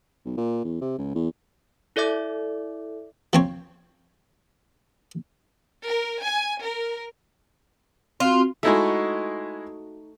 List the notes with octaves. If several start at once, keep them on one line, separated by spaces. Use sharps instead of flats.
B1
A#2
E2
C3
C#2
E2
E4 A4 D5 E5 D6
F3 C4 C#5
A#4
G#5
A#4
C4 F4 F#4
G#3 A3 D#4 E4 F#4 E5